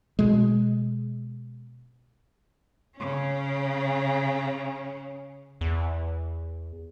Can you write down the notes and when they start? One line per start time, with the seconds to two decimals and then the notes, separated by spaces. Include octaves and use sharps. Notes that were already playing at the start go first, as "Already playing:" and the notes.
0.19 B2 G#3
2.97 C#3 C#4
5.61 E2